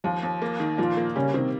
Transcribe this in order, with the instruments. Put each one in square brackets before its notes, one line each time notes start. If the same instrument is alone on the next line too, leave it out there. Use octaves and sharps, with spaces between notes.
[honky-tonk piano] D#2 [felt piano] F3 F4
[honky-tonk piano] D#2
A#3
D#3
[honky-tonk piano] A#2 [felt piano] F3 F4
[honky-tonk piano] A#3
[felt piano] C#3 C#4 [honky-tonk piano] G3
[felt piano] C3 C4 [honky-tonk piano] D#3